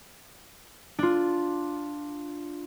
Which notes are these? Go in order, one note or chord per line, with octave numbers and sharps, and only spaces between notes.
D4 F4